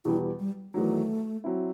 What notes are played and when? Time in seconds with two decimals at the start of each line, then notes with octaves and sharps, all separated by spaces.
0.05 E2 B2 G3 E4
0.39 G3
0.74 E2 D#3 F#3 A3
1.44 F#3 C4 E4